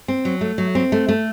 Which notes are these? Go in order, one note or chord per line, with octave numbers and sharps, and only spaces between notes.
C4
F#3
A3
F#3
C4
A3
A3